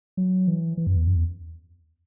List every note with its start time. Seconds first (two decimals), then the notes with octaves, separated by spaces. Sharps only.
0.17 F#3
0.48 E3
0.77 E3
0.87 F#2
0.96 E2
1.07 F#2
1.15 E2